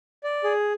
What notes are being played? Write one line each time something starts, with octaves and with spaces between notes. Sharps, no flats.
D5
G#4